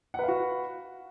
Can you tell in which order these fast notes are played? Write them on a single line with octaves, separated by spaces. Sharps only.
F#5 B4 F5 F#4